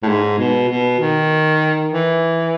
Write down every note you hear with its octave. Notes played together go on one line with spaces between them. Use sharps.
A2
G#2
B2
B2
D#3
E3